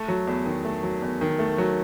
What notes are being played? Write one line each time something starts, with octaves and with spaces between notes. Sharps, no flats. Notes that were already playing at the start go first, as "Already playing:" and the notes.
Already playing: A3
F#3
E2
D#3
A3
F#3
E2
D#3
A3
F#3